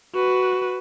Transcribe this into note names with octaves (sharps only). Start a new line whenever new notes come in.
F#4 B4